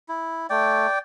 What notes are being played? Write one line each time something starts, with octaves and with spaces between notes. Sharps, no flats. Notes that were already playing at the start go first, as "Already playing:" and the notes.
E4
A3 D5 G5